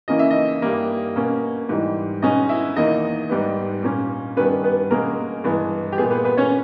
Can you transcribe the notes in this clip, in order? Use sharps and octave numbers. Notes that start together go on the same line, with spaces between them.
C#3 E3 A#3 C#4 D#5
E5
D#4 D#5
G2 G3 A#3
B2 A#3 C#4
G#2 E3 G3
B2 G#3 C#4 D#4 D#5
E4 E5
E2 D#3 A#3 D#4 D#5
G#2 G3 B3
A#2 A#3 C#4
G2 D#3 G3 B3 C#4 B4
B3 B4
B2 G#3 A#3 C#4 A#4
G2 E3 G#3 B3
G4
A#2 G#3 B3 G#4
B3 B4
B3 B4
C#4 C#5